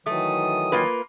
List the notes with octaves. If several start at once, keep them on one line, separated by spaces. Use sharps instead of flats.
D#3 E3 F#3 A3 D#6
A#3 F4 B4